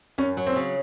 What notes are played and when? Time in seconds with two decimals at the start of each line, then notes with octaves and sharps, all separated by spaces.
0.18 F#2 C#4
0.37 F#3
0.47 C4
0.56 C#3